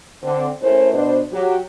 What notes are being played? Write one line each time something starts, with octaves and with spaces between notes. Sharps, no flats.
D3 C4
A3 C#4 E4 A#4 C5
B2 D4 C5
F#3 G4